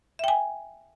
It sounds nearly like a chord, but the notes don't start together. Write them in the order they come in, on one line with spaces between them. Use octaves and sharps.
E5 G5 G#5